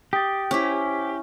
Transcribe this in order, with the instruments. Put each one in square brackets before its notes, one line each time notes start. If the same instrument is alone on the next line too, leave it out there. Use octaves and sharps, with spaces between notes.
[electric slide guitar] G4 [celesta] D#6 A6
[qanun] C#4 E4 [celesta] C5 D6 B6